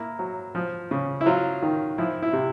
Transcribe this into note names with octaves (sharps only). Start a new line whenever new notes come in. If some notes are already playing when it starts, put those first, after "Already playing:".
Already playing: A#3 E4
F#3
F3
C#3
E4
F#3 F4
D#3
F3 E4
E4
C3